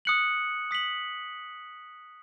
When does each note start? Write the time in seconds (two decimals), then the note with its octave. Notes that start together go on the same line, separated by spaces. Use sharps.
0.05 D#6 F#6 C#7 F#7
0.71 D#6 B6 F#7